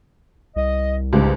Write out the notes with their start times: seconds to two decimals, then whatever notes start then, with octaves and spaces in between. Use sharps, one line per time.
0.56 C2 D#5
1.13 C#2 G#2 C#3 D4 G4